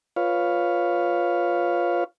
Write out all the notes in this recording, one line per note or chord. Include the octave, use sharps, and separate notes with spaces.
F4 B4 C#5 F5